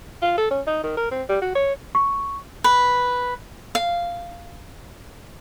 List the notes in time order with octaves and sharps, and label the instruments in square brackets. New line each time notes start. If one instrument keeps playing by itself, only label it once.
[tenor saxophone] F4
A4
C#4
D#4
D#3
A#4
C4
G3
F#4
C#5
[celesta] C#6
[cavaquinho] B4
F5